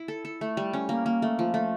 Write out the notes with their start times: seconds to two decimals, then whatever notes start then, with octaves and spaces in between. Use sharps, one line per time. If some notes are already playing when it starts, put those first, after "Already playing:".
Already playing: E4
0.08 A4
0.25 A4
0.41 A3
0.57 G3
0.73 C#4
0.89 A#3
1.06 A#3
1.22 A3
1.39 F3
1.54 A3